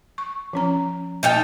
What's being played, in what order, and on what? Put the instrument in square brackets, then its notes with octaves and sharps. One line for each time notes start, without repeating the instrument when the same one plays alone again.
[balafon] C#6
F3 C#4 A#5
[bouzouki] D#4 A4 G5